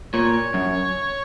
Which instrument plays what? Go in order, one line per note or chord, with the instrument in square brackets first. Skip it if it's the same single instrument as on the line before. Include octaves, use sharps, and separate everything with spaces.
[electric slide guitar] A#2 [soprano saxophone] C#5
[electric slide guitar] F#2